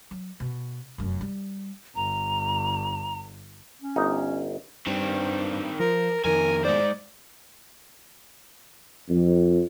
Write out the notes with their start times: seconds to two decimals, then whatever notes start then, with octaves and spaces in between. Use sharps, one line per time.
0.11 F#3
0.40 B2
0.98 F1 F#2
1.21 G3
1.95 G1 A#5
3.82 C#4
3.96 G1 D#4
4.87 G2 D#3 C4
5.80 F3 A#4
6.25 F2 D#3 A#4 G#5
6.64 G#3 C5 D5
9.09 F2